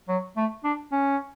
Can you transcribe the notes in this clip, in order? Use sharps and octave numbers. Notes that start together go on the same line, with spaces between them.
F#3
A3
D4
C#4